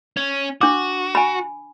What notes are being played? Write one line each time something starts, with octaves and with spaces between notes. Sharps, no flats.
C#4
D4 F#4 D6
G#5 B5